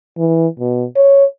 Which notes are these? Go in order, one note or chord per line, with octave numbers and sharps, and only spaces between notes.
E3
B2
C#5